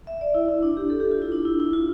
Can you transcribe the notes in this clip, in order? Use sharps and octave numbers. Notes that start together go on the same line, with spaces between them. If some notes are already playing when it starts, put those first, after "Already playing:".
E5
D5
E4
E4
D4
G4
A4
G4
F4
E4
D4
E4
E4
F4